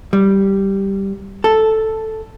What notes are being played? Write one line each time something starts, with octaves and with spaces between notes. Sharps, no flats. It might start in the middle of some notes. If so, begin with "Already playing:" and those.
G3
A4